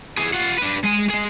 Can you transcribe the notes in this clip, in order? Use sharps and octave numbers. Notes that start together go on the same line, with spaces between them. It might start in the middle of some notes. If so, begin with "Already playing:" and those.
E4 G#4
F4 F#5
D4 B4
G#3 G#5
G#3 G#4